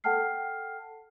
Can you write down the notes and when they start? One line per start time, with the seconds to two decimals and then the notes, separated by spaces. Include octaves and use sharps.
0.04 A4 F#5 G5 A5 F6 C7